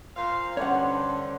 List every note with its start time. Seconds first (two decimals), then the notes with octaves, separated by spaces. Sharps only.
0.17 A#2 C5 F5
0.57 G2 D3 C#4 C5 C#5 F#5